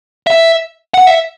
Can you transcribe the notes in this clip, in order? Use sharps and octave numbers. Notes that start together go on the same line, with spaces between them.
E5
F#5
E5